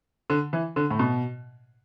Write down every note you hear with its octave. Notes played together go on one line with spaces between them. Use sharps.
D3
E3
D3
A2
B2